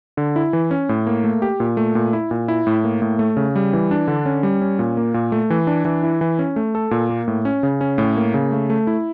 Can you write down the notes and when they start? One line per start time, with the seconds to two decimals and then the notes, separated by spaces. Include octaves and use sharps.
0.17 D3
0.36 E4
0.53 E3
0.71 C#4
0.89 A2
1.07 A#3
1.24 A3
1.42 G4
1.60 A#2
1.77 A3
1.95 A#2
2.13 E4
2.31 A#2
2.48 E4
2.67 A2
2.84 A#3
3.02 A2
3.19 A3
3.37 C#3
3.56 G3
3.73 E3
3.91 D4
4.08 D3
4.26 C#4
4.43 G3
4.62 C#4
4.79 A#2
4.97 A#3
5.14 A#2
5.32 A3
5.50 E3
5.67 D4
5.85 E3
6.03 E4
6.21 E3
6.39 C#4
6.56 A3
6.75 A4
6.91 A#2
7.10 A#3
7.28 A2
7.45 C#4
7.63 C#3
7.81 C#4
7.98 A2
8.17 A#3
8.34 C#3
8.52 A3
8.70 A3
8.87 E4